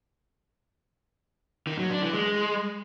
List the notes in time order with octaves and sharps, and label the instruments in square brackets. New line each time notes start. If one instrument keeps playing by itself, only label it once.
[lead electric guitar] D#3
F#3
D4
E3
G#3